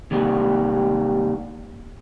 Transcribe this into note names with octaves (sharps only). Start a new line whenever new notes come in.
D#2 C3 G3